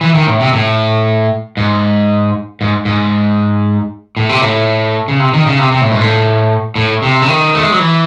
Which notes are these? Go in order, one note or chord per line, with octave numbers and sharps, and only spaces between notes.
E3
D#3
A2
C3
A2
G#2
G#2
G#2
A2
C3
A2
C#3
C3
D#3
C#3
C3
C3
A2
G#2
A2
A2
C3
C#3
D#3
A3
G#3
F#3
E3